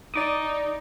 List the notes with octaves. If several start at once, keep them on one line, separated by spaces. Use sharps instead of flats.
D#4 D5 D6 D#6